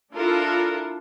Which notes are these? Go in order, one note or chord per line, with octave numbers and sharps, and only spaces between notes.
D4 E4 F4 A4 A#4